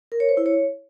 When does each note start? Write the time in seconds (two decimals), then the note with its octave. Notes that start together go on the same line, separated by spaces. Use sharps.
0.12 A#4
0.20 C#5
0.29 C5
0.37 E4
0.46 C#5